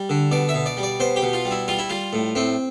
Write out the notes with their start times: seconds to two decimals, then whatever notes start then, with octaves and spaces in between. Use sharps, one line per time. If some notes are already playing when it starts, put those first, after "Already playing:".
Already playing: G3
0.09 D3
0.32 B2 D5
0.49 E5
0.54 B2
0.66 D5
0.77 G3
0.83 D5
1.00 B2 C5
1.16 G4
1.22 B2
1.33 F4
1.45 G3
1.51 E4
1.68 G3 F4
1.79 E4
1.90 G3 F4
2.13 A2
2.35 A2 C4